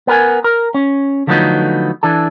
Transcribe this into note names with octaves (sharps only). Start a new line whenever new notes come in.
B3 A#4 G#5
A#4
C#4
D3 F3 F#3 A3 B3 D#4
E3 D4 A4